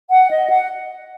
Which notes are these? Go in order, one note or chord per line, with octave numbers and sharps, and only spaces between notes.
F#5
D#5
F#5